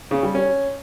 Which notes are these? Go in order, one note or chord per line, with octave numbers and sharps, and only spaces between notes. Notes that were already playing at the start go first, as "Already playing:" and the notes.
C#3
G3
C#4